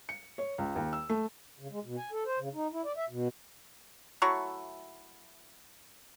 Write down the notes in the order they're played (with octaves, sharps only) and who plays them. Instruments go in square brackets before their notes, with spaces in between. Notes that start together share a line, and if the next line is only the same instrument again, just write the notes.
[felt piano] C#7
C#5
C#2
D#2
E6
A3
[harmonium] C#3
G#3
B2
G#5
A4
C5
C#3
D#4
E4
D5
E5
B2
[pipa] F#3 A3 E4 C#6